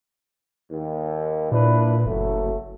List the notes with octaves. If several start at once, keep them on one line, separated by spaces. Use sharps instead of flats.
D#2
A#2 D4 E4 B4
F#1 F#3 A3